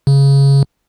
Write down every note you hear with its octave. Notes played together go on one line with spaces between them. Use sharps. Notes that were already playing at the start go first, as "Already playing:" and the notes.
C#3